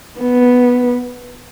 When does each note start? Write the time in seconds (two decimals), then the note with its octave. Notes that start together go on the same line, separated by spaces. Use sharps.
0.20 B3